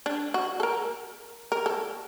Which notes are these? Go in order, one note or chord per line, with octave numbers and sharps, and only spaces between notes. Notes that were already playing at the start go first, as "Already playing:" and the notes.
D4
F#4
A4
A#4
A#4
A4